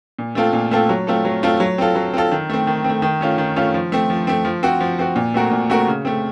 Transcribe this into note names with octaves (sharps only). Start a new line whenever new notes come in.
A#2
A3 C4 F4 A4
A#2
A3 C4 F4 A4
F#3
A3 C4 F4 A4
F#3
A3 C4 F4 A4
F#3
C4 F4 A4
F#3
C4 F4 A4
D#3
A3 C4
D#3
A3 C4
D#3
A3 C#4 F4
D#3
A3 C#4 F4
F3
A3 C4
F3
A3 C4
F3
C4 F#4
F3
C4 F#4
A#2
A3 C4 F#4 A#4
A#2
A3 C4 F#4 A#4
C#3
A3 C4